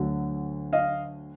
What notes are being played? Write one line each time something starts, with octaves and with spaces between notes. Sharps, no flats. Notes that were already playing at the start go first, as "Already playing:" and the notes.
Already playing: D2 D3 F#3
D#5 F5